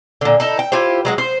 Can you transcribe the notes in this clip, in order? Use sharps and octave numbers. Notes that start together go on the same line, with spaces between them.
A#2 D3
D#4 E4 A4
G5
E4 F4 G4 C5
F#3 G#3 F#4
C5